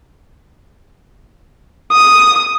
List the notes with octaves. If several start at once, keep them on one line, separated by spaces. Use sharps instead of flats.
D#6